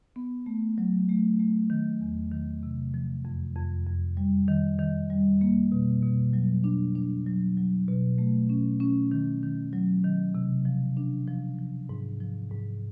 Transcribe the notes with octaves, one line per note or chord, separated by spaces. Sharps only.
B3
A3
F#3
A3
A3
D#3
E2
D#3
C3
F3
F2
F2
F2
G3
D#3
D#3
G3
A#3
B2
B2
F#3
D4
D4
F#3
F#3
B2
A3
C#4
C#4
D#3
D#3
F#3
D#3
C3
F3
D4
F3
F3
G#2
F3
G#2